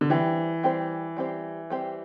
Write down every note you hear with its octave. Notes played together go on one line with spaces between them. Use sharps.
D3
E3 G3 C4 G4 C5
G3 C4 G4 C5
G3 C4 G4 C5
G3 C4 G4 C5